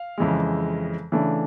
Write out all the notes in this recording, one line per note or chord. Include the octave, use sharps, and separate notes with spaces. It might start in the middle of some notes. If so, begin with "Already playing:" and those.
Already playing: F5
F2 C#3 E3 G#3
C#3 E3 A3 D4